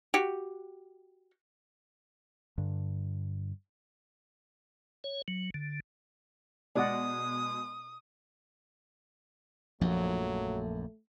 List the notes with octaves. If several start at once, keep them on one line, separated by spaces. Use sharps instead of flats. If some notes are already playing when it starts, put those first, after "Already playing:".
F#4 G4
G2 D3
C#5
F#3
D3
B2 G#3 D5 D#5 F#5 D#6
A#1 F#2 F3 F#3 A3